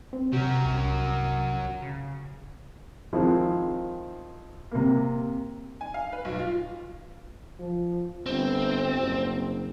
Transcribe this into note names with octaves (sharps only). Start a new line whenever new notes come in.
C4
C3 F#3 G4 A#4
C2
C#3
D#3 F3 G#3 C4 E4
C3 A#3
G#5
F5
B4
B1
F4
F3
G1 C4
F#1